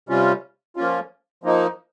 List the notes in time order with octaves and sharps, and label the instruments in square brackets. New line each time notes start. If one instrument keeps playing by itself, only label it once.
[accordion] C3 G3 C#4 F4
F3 A#3 C#4 F4
F3 A#3 D#4